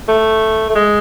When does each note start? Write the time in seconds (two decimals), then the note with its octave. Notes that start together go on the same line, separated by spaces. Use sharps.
0.08 A3
0.70 A3
0.75 G#3